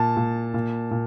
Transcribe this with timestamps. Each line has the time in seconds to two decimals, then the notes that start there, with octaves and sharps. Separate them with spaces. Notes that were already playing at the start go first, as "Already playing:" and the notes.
Already playing: A#2 A5
0.17 A#2
0.54 A#2
0.91 A#2